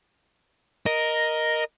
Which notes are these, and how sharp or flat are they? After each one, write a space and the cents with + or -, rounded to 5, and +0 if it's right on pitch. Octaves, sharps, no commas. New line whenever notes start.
A#4 +5 D#5 +0